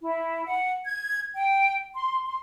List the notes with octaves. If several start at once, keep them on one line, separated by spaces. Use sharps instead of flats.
E4
F#5
G#6
G5
C6
C6